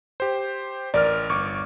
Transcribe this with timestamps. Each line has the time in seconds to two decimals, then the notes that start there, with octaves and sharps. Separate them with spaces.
0.20 G4 C5
0.94 A1 A#4 D5 F6
1.29 G1 C#6 D6